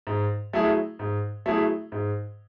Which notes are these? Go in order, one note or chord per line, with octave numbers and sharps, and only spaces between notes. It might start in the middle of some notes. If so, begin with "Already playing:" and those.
G#2
F#3 A3 E4 G#4
G#2
F#3 A3 E4 G#4
G#2